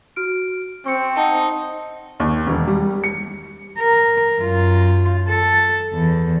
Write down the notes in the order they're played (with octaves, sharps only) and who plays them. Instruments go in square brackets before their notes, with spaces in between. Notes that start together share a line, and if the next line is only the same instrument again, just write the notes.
[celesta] F#4 F6 D7
[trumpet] C4 [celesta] C#6 C#7
[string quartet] D#4 [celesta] F#5 A5
[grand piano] D#2
E1
G3
C#7
[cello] A#4
F#2 F4
A4
E2